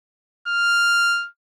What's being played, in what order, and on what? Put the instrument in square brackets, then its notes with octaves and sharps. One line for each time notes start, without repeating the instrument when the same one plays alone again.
[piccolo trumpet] F6